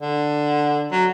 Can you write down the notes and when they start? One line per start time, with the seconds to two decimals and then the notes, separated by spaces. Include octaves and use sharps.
0.01 D3
0.92 F#3